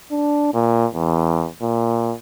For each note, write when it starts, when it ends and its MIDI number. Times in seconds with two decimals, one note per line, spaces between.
0.11 0.53 62
0.54 0.86 46
0.94 1.47 40
1.62 2.14 46